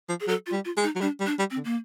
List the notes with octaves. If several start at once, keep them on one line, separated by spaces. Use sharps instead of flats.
F3
G#4
F#3 A4
F4
G3
F4
G#3
D#4
F#3
G3 D4
G3
D4
G3
C4
D3
A#3